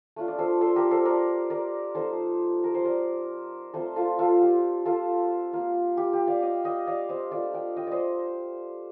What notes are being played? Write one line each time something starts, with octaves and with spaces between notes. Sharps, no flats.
A3 D4 F4
D5
A4 C5
A4 C5
G4 A#4
A4 C5
A#4 D5
A#4 D5
F3 C4 D#4 A4 C5
A#4
C5
A#4 D5
A3 C4 F4 A4 C5
F4 A4
F4 A4
G4
F4 A4
A#3 F4
G4
G4
D5 F5
D#5 G5
D#5 G5
D5 F5
C5 D#5
A3 D4 F4 D5 F5
D#5 G5
D#5 G5
C5 D5 D#5